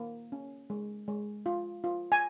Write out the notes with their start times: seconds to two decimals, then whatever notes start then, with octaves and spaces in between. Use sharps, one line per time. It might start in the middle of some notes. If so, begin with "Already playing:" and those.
Already playing: A#3
0.32 C#4
0.70 G#3
1.08 G#3
1.46 F4
1.84 F4
2.12 G#5